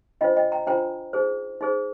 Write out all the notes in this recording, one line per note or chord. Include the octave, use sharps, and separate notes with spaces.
D4 F4 C5 D#5 G5
D#5 G5
G5 A#5
D4 F4 C5 G5 A#5
D#4 G#4 C5
D#4 G#4 C5